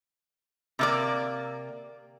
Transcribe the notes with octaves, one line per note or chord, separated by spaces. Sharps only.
C3 A#3 D5